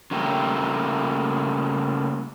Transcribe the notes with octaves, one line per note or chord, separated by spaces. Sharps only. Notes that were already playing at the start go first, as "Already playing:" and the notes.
C#3 G3 A3 A#3 G4